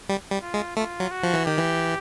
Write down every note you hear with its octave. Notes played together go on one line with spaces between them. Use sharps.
G3
G3
F4
G#3
A3 F4
F#3
F#4
F3
E3
D#3 G4
E3